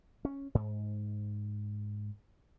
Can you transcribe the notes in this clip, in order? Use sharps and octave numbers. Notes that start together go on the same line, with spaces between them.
C#4
G#2